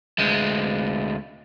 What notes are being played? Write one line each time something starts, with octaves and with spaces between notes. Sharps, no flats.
D2 G#3